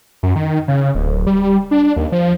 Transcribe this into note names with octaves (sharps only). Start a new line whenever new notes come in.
F#2
D#3
C#3
D1
G3
D4
D#2
F3